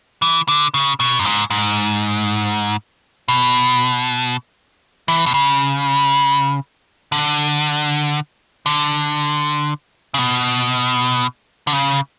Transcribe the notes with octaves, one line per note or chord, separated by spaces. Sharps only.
E3
D3
C#3
B2
F#2
G#2
G#2
B2
E3
B2
C#3
D3
D3
C#3
B2
D3
C#3